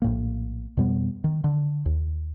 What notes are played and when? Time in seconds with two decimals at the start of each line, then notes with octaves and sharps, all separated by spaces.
0.02 A#1 A2 A#3
0.77 F2 B2 G3 B3
1.24 D#3
1.44 D3
1.86 D#2